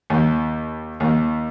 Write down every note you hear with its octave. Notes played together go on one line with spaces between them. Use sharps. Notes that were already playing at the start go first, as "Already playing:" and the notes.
D#2
D#2